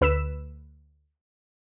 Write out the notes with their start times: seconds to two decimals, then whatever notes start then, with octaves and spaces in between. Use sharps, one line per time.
0.01 D2 B4 E6 B6 E7